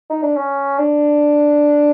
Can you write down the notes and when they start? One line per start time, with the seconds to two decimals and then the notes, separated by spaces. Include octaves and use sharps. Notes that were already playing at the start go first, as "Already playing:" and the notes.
0.10 D#4
0.23 D4
0.36 C#4
0.78 D4